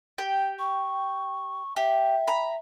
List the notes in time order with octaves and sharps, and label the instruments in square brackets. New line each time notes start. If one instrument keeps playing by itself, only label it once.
[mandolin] G4 G5
[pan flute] C#6
[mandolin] G4 [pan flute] E5
[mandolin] A#5 B5